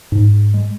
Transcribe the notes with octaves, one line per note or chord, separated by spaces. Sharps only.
G#2
G#3